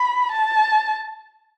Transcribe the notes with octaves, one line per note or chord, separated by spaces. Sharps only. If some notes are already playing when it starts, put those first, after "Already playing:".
Already playing: B5
A5